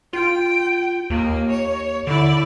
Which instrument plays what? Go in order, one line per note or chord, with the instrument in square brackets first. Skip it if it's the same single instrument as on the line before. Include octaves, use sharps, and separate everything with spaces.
[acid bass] F4 [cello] G5
[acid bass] D#2 [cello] A#3
[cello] C#5
[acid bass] D3 [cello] E4 D5